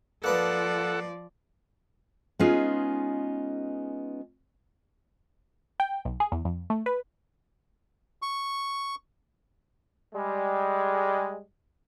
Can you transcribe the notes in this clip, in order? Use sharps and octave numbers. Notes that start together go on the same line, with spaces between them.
F3 A#3 A4 B4 D5 D#5 F#5
G#3 B3 C#4 D#4 F4 G#4
G5
B1
G#4
E2
F2
A3
B4
C#6
G3 G#3